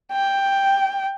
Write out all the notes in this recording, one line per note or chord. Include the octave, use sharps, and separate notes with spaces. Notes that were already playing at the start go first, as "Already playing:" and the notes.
G5